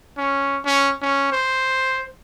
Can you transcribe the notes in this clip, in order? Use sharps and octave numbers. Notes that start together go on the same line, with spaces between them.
C#4
C#4
C#4
C5